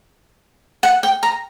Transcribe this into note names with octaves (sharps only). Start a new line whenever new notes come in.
F#5
G5
A#5